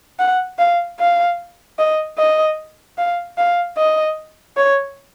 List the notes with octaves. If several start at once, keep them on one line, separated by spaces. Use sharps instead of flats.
F#5
F5
F5
D#5
D#5
F5
F5
D#5
C#5